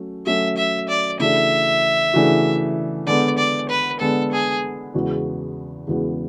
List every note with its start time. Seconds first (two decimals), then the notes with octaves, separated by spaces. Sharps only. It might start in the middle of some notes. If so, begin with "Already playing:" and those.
Already playing: F#3 A3 C#4
0.26 F#3 A3 C#4 E5
0.57 E5
0.89 D5
1.20 C#3 E3 A3 D4 F#4 E5
2.14 C#3 E3 A3 D4 F#4
3.07 D3 G#3 B3 D5
3.38 D5
3.69 B4
4.00 D3 G#3 B3 A4
4.32 G#4
4.94 E2 C#3 G#3 B3 F#4
5.87 E2 C#3 G#3 B3 F#4